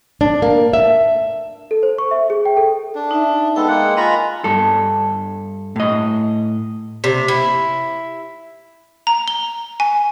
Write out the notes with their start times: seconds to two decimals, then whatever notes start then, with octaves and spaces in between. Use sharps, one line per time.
0.21 D4
0.42 A#3
0.73 E5
1.71 A4
1.83 C5
1.98 C#6
2.11 E5
2.30 G#4
2.46 G5
2.57 A4
2.95 D4
3.11 D#4 E5
3.56 G#3 B3 A4 G5
3.68 G#3 A#3 F#5
3.97 F4 D#5 G#5 A#5 B5
4.44 G2 A4
5.76 A2 D#5
7.04 C3
7.28 E4
9.07 A#5
9.28 G7
9.80 G#5